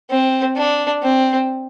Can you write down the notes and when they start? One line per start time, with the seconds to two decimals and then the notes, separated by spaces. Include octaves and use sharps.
0.10 C4
0.56 D4
1.03 C4